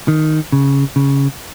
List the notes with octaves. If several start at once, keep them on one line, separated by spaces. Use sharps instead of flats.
D#3
C#3
C#3